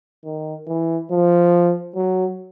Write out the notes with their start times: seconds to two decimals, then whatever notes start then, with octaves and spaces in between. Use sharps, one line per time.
0.24 D#3
0.68 E3
1.11 F3
1.96 F#3